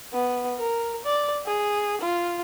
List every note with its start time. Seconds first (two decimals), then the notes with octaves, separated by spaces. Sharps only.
0.13 B3
0.59 A#4
1.05 D5
1.46 G#4
2.01 F4